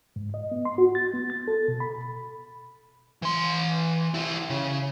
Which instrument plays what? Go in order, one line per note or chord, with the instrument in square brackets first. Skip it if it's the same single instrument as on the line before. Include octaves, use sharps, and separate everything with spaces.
[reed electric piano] G#2
D#5
B3
C6
F#4
A6
B3
A6
A4
B2
B5
[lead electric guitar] E3 C6
E4 G4
C#3